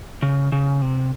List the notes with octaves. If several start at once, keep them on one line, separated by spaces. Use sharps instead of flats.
C#3
C#3
C3